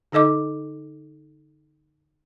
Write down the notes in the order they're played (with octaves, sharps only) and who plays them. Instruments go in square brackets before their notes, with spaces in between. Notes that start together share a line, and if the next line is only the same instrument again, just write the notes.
[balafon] D3 D#4 A4 D#5 D6